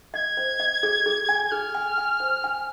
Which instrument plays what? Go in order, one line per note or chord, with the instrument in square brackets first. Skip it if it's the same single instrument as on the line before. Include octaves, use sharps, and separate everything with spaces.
[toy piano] D#5 [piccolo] G#6
[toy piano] C5
D#5
G#4
G#4
G#5
[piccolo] G#6
[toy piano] G#4 [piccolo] F6
[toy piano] G#5
G#5
C5
G#5